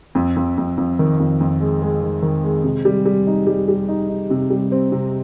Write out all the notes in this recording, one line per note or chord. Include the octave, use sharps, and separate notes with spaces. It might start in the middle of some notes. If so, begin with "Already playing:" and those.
F2
F2
F2
F2
D#3
F2
F2
G#3
G#3
D#3
D#3
G#3
C3
G3
G3
D#4
G3
G3
D#4
D#4
C3
G3
C4
C3